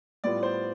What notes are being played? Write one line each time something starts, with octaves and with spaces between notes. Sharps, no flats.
A2 G3 B3 F4 D5
C5